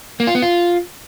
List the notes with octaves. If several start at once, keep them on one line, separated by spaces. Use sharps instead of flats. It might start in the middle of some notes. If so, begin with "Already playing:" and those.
A#3
F4
B3
F4